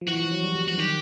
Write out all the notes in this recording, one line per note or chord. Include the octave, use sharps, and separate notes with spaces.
F3
E3 F#4
F3
F#3
G3
F#3
F3 F#4
D#3 G4